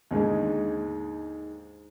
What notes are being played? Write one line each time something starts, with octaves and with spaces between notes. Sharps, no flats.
D#2 G#2 D3 G#3